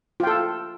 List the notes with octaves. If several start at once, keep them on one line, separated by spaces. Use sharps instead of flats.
F4 A4 G5